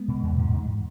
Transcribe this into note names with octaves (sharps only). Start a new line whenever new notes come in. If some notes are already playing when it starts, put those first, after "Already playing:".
Already playing: G#3 B3
B2
E2
G#2
G#2